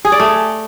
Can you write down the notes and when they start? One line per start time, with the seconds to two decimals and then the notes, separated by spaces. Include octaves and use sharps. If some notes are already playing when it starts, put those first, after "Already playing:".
0.05 G#4
0.12 D5
0.20 A3